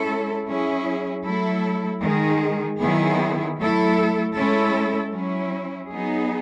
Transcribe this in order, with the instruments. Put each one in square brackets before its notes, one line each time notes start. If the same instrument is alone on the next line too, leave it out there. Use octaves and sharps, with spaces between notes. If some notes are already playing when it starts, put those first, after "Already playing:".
Already playing: [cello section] G#3 C#4 E4 A4
F#3 C#4 E4 G#4
F#3 A3 E4 A4
D#3 G#3 D#4 G#4
D#3 F#3 B3 E4 G#4
F#3 A3 E4 A4
G#3 C#4 E4 A4
F#3 C#4 E4
F#3 B3 D#4 G#4